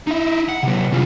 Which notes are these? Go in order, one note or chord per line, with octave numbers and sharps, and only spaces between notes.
D#4 E4
F#5
C3 F#3
C2 F4